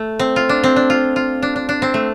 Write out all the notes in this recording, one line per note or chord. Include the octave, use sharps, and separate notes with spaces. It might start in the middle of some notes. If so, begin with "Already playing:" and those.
Already playing: A3
C4
F4
D4
C4
D4
F4
F4
D4
D4
D4
C4
A3